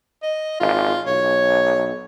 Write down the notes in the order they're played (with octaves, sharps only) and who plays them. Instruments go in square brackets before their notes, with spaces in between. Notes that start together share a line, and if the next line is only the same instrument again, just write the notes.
[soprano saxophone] D#5
[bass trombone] G#1 [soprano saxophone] F4
[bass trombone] B1 [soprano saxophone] C#5